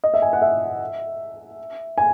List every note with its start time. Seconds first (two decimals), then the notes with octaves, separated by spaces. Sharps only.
0.04 D#5
0.14 E5
0.22 G#5
0.33 F#5
0.42 E5
1.98 G#5